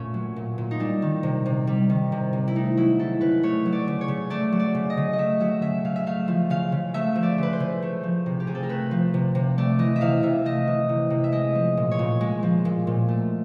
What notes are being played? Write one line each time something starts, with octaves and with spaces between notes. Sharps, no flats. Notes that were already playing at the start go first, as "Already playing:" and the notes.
Already playing: A#2 A3 C#4
F#3
A#2
A#2
D#4
G3 D4
D#3
C3
C3
G3
D#3
C3
C3
E4
A3 D#4
F#3 E4
C#3 A4
C#3 B4
A3 C#5
F#3
D5
C#3
C#5
C#3
A3 D5
F#3
D5
C#3
D#5
C#3
D#5
A3 E5
F#3 E5
C#3 E5
C#3 F5
E5
A3 F5
F3
C#3 F5
C#3
A3 E5
F3
D5
C#3 B4
C5
C#3
A3
F3
C3
G4
C3 G#4
A4
A#4
A3 B4
F3
C3
C3
A3 D5
E3 D#5
E5
C3 F5
C3 E5
A3 D#5
E3
C3
C3
E5
G#3 D#5
F3
A#2
C#5
A#2
G#3
F3
A#2
A#2
A3